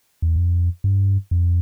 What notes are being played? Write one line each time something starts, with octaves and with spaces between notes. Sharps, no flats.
E2
F2
G2
F2